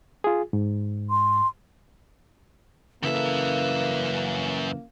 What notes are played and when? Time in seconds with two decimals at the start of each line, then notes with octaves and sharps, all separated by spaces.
0.24 F4 G#4
0.53 G#2
1.10 C6
3.03 F#2 C#3 E3 A#3 A4 B4 E5